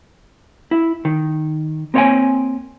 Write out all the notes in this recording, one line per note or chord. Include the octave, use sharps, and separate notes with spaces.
E4
D#3
A#3 C4 C#5 D5 G5 G#5